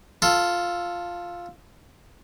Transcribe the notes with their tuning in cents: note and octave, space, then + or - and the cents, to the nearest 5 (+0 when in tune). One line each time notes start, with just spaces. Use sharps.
F4 +0 A4 +5